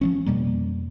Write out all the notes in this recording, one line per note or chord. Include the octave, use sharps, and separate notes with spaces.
F3 G#3 C#4
F2 B2 G3 A#3